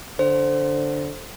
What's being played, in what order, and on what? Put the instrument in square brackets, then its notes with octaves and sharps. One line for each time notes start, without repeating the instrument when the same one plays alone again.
[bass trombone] D3 [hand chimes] C5